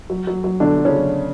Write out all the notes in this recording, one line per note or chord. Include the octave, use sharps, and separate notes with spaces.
F#3
F#3
F#3
B2 D3 D4
F#3
C#3 C#4
F#3